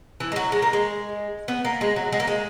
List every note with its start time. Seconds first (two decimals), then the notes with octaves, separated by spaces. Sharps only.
0.20 E3
0.32 G#3
0.36 F#3
0.52 G#3
0.62 A#3
0.73 G#3
1.48 B3
1.65 A#3
1.81 G#3
1.96 F#3
2.13 G#3
2.20 A#3
2.27 G#3